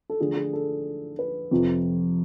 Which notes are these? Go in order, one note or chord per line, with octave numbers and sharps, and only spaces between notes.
A4
D3 F3 A3 G#4
G#4
A4
B4
F2 C3 F3